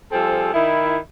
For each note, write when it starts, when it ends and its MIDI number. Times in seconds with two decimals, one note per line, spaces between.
0.12 0.50 53
0.12 0.50 55
0.12 0.50 60
0.12 0.50 68
0.12 0.50 69
0.53 0.97 51
0.53 0.97 64